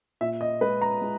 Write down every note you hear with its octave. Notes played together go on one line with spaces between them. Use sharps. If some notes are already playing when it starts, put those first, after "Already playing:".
A#2 E5
D#5
G#3 B4
A#5
G#3